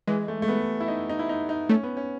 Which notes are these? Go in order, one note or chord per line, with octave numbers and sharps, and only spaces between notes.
E3 G#3
A3
A3
B3
E4
D#4
D#4
E4
D#4
D#4
A3 C#4
B3
C#4